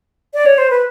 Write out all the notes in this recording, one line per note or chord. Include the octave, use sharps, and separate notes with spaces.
D5
C#5
C5
B4